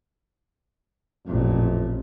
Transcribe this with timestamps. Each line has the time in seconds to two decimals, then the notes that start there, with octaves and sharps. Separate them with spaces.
1.26 A1 F2 A#2